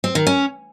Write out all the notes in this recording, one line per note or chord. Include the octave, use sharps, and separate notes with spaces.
C4
D#3
C#4